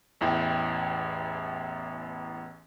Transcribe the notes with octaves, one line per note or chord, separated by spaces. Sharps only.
A1 E2 E4 G5